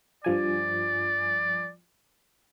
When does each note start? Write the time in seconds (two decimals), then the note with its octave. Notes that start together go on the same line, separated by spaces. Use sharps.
0.25 G2 F3 D5 G#5